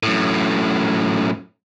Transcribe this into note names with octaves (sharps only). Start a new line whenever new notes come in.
F#2 A2